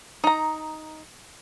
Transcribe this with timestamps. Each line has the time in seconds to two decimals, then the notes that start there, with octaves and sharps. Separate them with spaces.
0.24 D#4 A#5